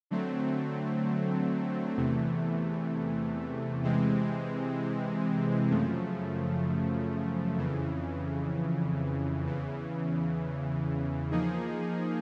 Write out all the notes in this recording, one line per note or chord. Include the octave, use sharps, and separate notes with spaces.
D3 F#3 A3 C4
E2 C3 E3 A3
C3 E3 G#3 C4
F#2 C#3 F3 A3
F2 C#3 E3
E2 C#3 E3
F3 A#3 D#4 G#4